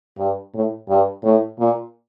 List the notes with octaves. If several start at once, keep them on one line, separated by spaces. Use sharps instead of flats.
G2
A2
G2
A2
A#2